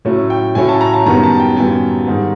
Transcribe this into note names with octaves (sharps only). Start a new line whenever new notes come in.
A2 F#3 A3 C#4
G5
A2 F#3 A3 C#4 G#5
A5
A#5
A5
F#2 D#3 G3 B3 A#5
A5
G5
F#2 D#3 G3 B3 G#5
G#2 D#3 G3